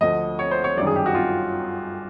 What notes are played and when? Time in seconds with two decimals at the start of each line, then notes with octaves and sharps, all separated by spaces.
0.01 D2 D3 F3 D#5
0.39 C#5
0.51 C5
0.64 C#5
0.77 G1 F#2 D#3 D5
0.86 G#4
0.96 G4
1.06 F#4
1.15 F4